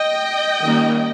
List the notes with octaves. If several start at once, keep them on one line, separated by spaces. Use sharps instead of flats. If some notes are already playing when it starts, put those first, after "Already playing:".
Already playing: D#5 G5
D#3 G3 A#3 C#4